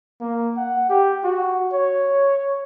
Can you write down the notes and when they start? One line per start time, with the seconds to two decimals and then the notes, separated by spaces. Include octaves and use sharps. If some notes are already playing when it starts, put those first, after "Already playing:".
0.21 A#3
0.57 F#5
0.89 G4
1.24 F#4
1.73 C#5